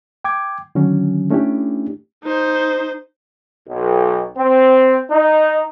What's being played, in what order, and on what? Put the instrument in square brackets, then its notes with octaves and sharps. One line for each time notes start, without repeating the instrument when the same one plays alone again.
[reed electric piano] G5 D6 G#6
D3 D#3 F#3 C#4
A3 C#4 D4 E4 G4
[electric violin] D#4 C5
[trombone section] B1
C4
D#4